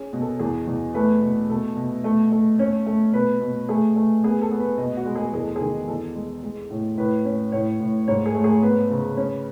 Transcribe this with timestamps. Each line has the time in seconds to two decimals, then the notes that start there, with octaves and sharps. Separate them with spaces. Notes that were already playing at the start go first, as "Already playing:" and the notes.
Already playing: C#4 G#4
0.13 B2
0.21 A4
0.39 E2 G#4
0.67 E2
0.94 A3 B4
1.21 B2
1.50 B2 A4
1.77 B2
2.04 A3
2.32 A3
2.59 C#4
2.86 A3
3.13 B2 B4
3.41 B2
3.69 A3 G#4
3.96 A3
4.24 B3 G#4
4.42 A4
4.52 B3
4.60 B4
4.78 B2 D#5
4.97 F#4
5.06 G#3
5.15 G#4
5.33 E2 G#4
5.44 A4
5.56 D#3 G#4
5.88 E2 A4
6.16 G#3
6.43 G#3
6.71 A2
6.98 A2 B4
7.25 C#4
7.52 A2 C#5
7.80 A2
8.08 G#2 C#5
8.26 G#4
8.35 A3
8.44 G#4
8.62 B3 B4
8.90 C#3
9.17 C#4